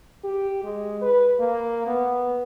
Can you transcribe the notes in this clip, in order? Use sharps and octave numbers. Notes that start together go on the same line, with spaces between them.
G4
G#3
B4
A#3
B3